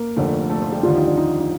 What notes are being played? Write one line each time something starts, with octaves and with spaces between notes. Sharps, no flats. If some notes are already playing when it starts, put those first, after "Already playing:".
Already playing: A#3 A#4
F1 F2 D3 F3 A3
A3 A4
F3 F4
G3 G4
D#2 D3 F3 G3 F4
D#4
D4
D#4
D#4